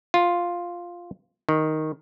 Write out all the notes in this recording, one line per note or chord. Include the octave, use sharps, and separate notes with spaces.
F4
D#3